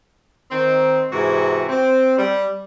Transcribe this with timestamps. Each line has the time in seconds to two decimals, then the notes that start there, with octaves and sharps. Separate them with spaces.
0.51 D#3 C4
1.11 G#2 C3 E3 F#4
1.68 C4
2.17 G3